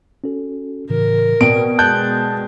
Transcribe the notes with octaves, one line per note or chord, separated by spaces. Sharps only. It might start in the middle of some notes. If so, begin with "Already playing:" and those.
C#4 F#4 A4
A2 C#3 E3 A#4
B2 D5 G5 D7
G#3 A5 F#6 G6